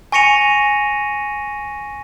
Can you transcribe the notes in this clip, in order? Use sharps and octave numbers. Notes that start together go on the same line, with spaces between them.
G#5 C#6 A#6 C#7 D#7 F7